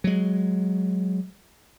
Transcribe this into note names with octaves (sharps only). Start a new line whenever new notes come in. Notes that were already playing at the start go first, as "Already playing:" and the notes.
F#3 G#3